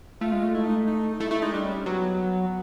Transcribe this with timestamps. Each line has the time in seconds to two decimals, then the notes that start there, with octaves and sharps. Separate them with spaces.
0.21 A3 F4
0.32 G#3
0.44 A3
0.54 E4
0.65 D#4
0.87 D#4
1.20 A3 E4
1.31 A3 E4
1.42 G#3 D#4
1.53 G3 D4
1.64 C#4
1.86 F#3 B3